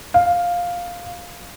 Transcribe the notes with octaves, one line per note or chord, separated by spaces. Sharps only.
F5